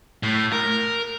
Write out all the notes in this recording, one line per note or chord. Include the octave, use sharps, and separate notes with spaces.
A2
A#4